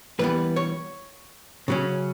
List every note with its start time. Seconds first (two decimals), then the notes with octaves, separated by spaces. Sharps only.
0.19 E3 G3 B3 B4
0.56 C#5
1.68 C#3 F#3 C#4